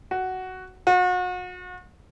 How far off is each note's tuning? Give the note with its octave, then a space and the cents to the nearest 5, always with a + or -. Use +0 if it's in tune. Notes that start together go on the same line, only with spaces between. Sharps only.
F#4 +10
F#4 -35